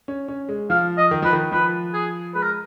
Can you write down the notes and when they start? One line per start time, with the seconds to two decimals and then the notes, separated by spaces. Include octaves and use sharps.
0.08 C#4
0.28 C#4
0.49 G#3
0.70 F3 F5
0.98 D#5
1.11 D#3
1.22 F3 B4
1.33 D#3
1.52 F3 B4
1.94 G#4
2.35 G#3 B4
2.43 A#4